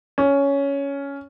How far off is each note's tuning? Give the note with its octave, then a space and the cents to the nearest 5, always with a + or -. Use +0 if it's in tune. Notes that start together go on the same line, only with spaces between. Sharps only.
C#4 +10